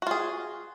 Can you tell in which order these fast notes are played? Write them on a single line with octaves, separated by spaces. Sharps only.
F#4 F4 G#4